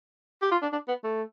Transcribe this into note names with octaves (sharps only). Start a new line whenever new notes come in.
G4
F4
D4
D4
B3
A3